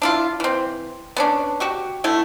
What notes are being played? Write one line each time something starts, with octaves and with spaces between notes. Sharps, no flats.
D4 E4 F4
E3 C4
B3 C#4 D4
F#4 G4 C#6
D3 A3 E4